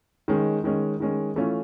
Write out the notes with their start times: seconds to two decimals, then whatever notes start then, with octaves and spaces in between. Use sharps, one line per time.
0.28 D#3 G#3 C#4
0.64 D#3 G#3 C#4
1.00 D#3 G#3 C#4
1.36 E3 A3 C#4 F4